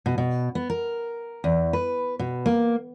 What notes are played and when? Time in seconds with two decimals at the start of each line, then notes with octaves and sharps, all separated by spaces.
0.06 B2
0.18 B2
0.55 B3
0.70 A#4
1.44 E2
1.73 B4
2.19 B2
2.46 A#3